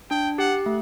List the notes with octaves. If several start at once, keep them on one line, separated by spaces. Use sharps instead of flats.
D4 G5
G4 F#5
A3